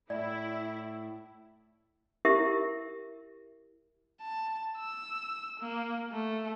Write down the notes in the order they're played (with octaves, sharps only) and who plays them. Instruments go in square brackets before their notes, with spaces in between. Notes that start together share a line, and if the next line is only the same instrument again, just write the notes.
[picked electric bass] A2 [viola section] E4 [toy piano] D5
[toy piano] E4 G4 A#4 E5
[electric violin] A5
E6
A#3
A3